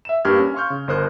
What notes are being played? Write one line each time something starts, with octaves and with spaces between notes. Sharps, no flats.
E5 E7
G2 A#3 G4 D#6 F6 G#6
C#4
F5 C6 C#6 F6 G6
C#3
G1 A#4 C5 D#6 F#6